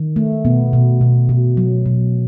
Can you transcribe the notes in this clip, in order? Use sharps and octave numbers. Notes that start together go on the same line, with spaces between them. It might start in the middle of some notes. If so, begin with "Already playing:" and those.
Already playing: D#3
A3
B2 B3
B2
B2
B2
F#3
B2